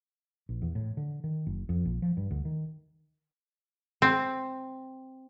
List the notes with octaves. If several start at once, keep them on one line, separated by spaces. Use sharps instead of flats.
A#1
E2
A2
D3
D#3
F#1
F2
A#1
F3
G2
D2
D#3
C4